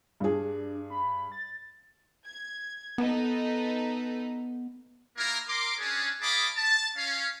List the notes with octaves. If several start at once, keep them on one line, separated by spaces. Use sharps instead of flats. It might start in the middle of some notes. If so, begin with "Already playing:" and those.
G2 D4 G#4
B5
A6
G#6
B3 D#4 A4 B4
A#3 E4 F4 A#4
A#4 C6 D6
C#4 D4 G#4
G#4 D#5 F5 A5 B5 D6
A5
C#4 F5